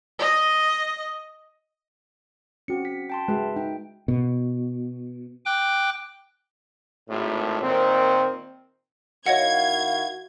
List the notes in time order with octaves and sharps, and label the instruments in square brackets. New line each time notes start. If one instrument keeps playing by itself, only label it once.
[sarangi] D#5
[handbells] C4 C#7 [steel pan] C#4 F#4
[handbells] B6
G5 A5 C6
[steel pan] G#3 F#4 [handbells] B4 E5
[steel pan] D#4 [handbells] G5
[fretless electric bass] B2
[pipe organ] G5 D6 F#6
[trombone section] G#1 A2
A#2 D#3 C4
[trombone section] D#3 E4 F#4 [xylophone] C#5 D#5 F#5 [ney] F5 [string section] G#6